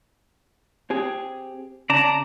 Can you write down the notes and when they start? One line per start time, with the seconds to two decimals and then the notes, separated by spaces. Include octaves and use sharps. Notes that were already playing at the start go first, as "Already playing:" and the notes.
0.90 C4 G4 G#4
1.90 C#3 D5 A5 A#5